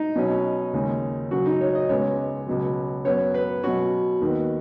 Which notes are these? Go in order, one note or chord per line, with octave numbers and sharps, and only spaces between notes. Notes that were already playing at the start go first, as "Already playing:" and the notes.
Already playing: D#4
B2 F#3 C#4
D#2 C#3 G#3 C#4
F#2 C#3 F#3 F#4
D#4
C#5
D#5
C#2 C#3 G#3 B3 C#5
C#2 B2 F#3
F#2 F#3 B3 C#5
B4
B2 F#3 C#4 F#4
D#2 D#3 B3